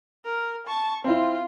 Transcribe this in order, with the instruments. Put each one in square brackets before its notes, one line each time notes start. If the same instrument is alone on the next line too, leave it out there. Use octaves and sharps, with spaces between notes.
[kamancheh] A#4
A5 C#6
[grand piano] C4 E4 [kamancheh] F4